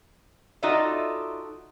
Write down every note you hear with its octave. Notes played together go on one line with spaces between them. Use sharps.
D#4 F4 F#4 A4 D5 E5